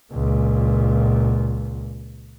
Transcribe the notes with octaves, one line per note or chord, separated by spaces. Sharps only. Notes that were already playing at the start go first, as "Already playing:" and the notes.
C#2 A#2